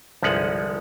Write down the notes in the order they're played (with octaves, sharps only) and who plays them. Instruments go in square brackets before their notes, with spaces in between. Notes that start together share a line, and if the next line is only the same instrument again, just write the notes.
[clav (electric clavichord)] G1 C2 F3 G#3 F#5